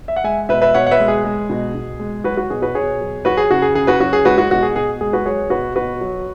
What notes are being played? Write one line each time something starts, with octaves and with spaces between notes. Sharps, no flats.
E5
F#5
G#3 E5 G#5
B2 B4 E5
B4 E5
B2 C#5 F#5
F#5
B4 E5
G#3
G#4
G#3
B2
B2
G#3
F#3 F#4 B4
F#4
B2 G#4
F#4 B4
B2 G#4 C#5
F#3
F#3 F#4 B4
G#4
C#3 F#4
G#4
C#3 G#4
F#4 B4
F#3 F#4
G#4
G#3 F#4 B4
F#4
B2 F#4
G#4
B2 G#4
G#3 G#4
F#4 B4
F#3 G#4 C#5
B2 F#4 B4
B2 F#4 B4
F#3